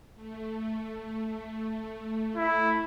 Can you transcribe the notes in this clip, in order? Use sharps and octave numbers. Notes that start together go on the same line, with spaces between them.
A3
E4